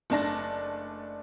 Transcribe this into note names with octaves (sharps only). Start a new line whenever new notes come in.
F#1 A3 D4 A5 A#6